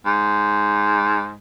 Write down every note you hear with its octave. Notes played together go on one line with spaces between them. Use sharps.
G#2